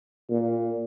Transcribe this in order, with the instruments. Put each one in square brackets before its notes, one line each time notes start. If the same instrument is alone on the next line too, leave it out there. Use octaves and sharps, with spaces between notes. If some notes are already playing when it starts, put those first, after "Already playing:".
[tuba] A#2